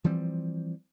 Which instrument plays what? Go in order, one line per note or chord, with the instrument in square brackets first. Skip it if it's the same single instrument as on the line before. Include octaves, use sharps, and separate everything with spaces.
[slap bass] E3 F3 G3 C4